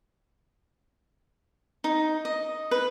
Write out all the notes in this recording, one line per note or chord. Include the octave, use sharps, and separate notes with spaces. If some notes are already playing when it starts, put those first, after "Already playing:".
D#4
D#5
B4